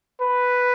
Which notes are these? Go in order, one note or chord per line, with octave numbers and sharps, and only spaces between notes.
B4